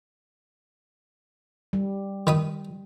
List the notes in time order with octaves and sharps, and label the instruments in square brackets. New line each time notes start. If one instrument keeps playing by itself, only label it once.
[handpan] G3
[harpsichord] D#3 B5 D#6